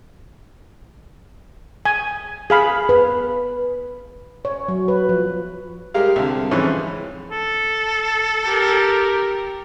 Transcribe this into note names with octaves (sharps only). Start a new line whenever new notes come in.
G#5
G#4 F5 B5
B4
C#5
F#3
B4
F3
G3 G#3 G4 A#4 F5
C2 D3
F2 G#2 E3 F3 C#4
A4
G4 A#4